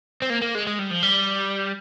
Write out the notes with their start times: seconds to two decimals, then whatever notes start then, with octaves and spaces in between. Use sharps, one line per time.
0.22 C4
0.30 A#3
0.42 A#3
0.55 G#3
0.67 G#3
0.79 G3
0.91 F3
1.03 G3